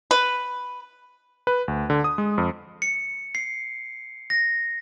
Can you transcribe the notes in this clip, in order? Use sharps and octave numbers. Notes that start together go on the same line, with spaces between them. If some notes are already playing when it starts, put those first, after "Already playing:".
B4
B4
D2
D3
D#6
G#3
F2
C#7
C7
A#6